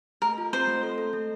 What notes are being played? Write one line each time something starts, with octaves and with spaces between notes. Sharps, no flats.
A3 A#4
F4
C4 C5
A3
A4
A4
A3